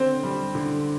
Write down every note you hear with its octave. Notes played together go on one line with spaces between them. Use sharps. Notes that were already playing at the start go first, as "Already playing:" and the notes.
Already playing: D3 C4 C5
G3
D3